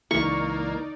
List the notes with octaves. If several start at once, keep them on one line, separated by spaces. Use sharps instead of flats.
C#2 E3 A#3 D#4 D5 C#6